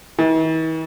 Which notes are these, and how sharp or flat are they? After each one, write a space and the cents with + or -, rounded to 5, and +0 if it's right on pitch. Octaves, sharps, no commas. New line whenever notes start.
E3 -45